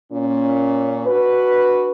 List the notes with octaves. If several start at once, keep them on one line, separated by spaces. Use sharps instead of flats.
A#2 C#4
D4 F#4 B4